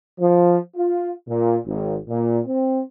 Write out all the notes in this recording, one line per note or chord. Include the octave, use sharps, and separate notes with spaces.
F3
F4
A#2
G#1
A#2
C4